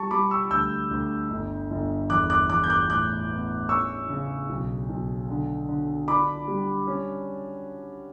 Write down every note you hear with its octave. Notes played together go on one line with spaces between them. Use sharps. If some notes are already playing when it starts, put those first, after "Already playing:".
Already playing: G3 A5 C#6
G3 B5 D6
C#6 E6
D2 E6 G6
D2
G1
G1
E2 D6 F#6
D6 F#6
E2 D6 F#6
G6
D6 F#6
A2 D6 F#6
B3
C#4 C#6 E6
C#3
B1
B1
D3
D3
D4 B5 D6
G3
C#4